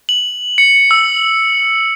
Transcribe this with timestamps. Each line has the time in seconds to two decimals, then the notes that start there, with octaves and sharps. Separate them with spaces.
0.09 F#7
0.58 C#7
0.91 E6